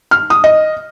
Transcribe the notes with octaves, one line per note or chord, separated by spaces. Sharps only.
F6
D#6
D#5